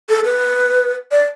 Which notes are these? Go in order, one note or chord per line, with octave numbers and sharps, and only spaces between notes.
A4
B4
D5